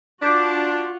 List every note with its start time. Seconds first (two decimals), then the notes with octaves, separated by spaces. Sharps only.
0.22 D4 F4 F#4 D6 G6 B6